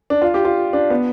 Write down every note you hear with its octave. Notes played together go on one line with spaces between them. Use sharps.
D4
F4
G4
F4
D4
B3